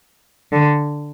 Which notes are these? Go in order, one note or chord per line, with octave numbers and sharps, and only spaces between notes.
D3